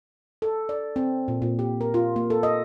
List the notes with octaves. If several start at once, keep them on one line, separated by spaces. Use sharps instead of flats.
A4
D5
C4
A#2
A#2
G4
A#4
F4
A#3
A4
D#5